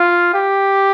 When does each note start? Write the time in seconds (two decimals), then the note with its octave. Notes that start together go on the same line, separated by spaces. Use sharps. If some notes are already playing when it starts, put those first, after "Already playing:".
Already playing: F4
0.34 G4